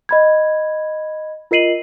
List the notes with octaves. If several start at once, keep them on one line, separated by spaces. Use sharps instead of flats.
D#5 B5 G#6
F4 A#4 D#5 C7 D#7 F#7